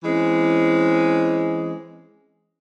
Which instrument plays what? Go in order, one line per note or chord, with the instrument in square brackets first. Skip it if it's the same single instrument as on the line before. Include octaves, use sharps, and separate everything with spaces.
[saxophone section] E3 G#3 C4 C#4